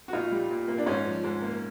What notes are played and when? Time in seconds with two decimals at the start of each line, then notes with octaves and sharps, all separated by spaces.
0.08 F#4
0.13 A#2 D#4 F4
0.31 G3
0.51 A#2
0.68 A#3
0.78 D4
0.86 G#2 C#4 D#4
1.05 F3
1.24 G#2
1.42 A#3